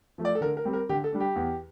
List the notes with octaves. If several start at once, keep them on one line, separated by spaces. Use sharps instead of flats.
F3 A3
D5
A4
D3 A#4
A#4
G3 C4
A#4
D3 G4
A4
G3 D4
G4
E2